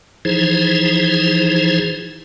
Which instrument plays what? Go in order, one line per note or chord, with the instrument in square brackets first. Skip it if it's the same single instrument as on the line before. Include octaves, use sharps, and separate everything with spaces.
[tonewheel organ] E3 F3 D#4 E4 G#4 C5